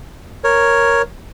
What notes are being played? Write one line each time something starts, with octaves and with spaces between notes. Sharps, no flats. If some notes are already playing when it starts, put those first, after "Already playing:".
A#4 C#5